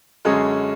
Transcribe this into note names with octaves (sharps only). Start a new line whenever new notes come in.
F#2 D3 G#3 C#4 G#4